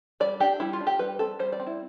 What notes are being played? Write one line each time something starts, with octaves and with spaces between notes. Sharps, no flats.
G3 D5
D4 G4
G3 E4
F4
D4
G4
G3 B4
C4 A4
G3 C5
D5
C4
E4